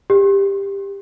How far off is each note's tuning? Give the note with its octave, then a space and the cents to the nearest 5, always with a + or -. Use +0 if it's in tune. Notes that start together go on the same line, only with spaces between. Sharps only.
G4 +15